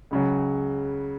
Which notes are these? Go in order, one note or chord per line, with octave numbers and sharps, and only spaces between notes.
C#2 C#3 F#3